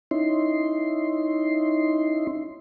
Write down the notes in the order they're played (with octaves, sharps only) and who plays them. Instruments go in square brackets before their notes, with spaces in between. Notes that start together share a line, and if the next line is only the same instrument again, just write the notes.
[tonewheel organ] C#4 D#4 E4 C6